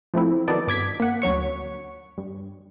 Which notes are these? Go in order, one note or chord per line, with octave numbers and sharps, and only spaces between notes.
F3 A3 C4 E4
D#3 F#3 B3 D#4 A4 D5
G2 D6 G#6 B6
A#3 F#5
D2 F#3 C#5 C#6
G2